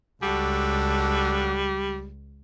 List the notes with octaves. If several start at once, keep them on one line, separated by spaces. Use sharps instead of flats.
C#2 G3 D4 F#4 A4